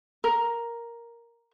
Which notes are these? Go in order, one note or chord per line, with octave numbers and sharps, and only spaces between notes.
A#4